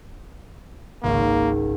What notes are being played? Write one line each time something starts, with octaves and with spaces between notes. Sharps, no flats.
G#1 C#2 A#3